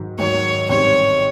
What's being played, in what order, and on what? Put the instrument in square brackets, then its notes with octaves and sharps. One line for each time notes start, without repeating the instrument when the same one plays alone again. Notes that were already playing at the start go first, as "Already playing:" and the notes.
Already playing: [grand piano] G#2 D#3 F#3
[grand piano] G#2 D#3 F#3 [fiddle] C#5
[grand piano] A1 G#2 D#3 G3 C4 [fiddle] C#5